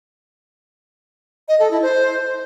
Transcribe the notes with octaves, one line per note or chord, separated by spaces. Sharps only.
D#5
A4
E4
C5